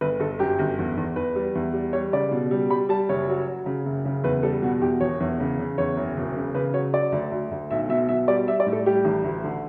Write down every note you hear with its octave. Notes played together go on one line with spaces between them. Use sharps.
G1 B4
G1 A4
F#2 G4
G1
E2
E2
E2 B4
G3
E2
G3
G3 C#5
C#3 D5
B2
G3
G3 B5
G3 A5
F#1 C#5
F#3
F#3
C#3
F#1
C#3
E2 B4
G3 A4
B2 F#4
E2 G4
E1 C#5
E2
C#3
C#3
E2 C#5
F#1
E1
C#3
C#3 B4
F#3 C#5
F#3 D5
D2
D2
D2
B1 E5
B2 E5
B2 E5
G3 D5
G3 E5
D5
A2
A4
G3 G4
A1
D2
D3